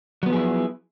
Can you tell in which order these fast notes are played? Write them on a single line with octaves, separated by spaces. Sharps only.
F#3 B3 F3 G#4 E4